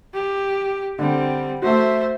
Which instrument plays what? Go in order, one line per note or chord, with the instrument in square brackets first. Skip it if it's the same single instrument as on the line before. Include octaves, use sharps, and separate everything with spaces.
[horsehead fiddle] G4
[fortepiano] D3 [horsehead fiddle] G3 C4
[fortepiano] A3 F#4 [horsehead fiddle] C5 E5